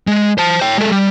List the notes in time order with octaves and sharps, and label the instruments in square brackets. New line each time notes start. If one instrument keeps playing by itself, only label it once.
[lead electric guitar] G#3
C5 A5
C#5 G5
G#3 A4
G3